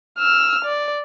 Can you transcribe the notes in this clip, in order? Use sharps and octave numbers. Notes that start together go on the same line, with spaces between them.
E6 F6
D5